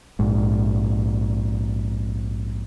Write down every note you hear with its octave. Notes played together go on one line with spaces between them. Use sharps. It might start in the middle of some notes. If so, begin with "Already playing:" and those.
A#1 G#2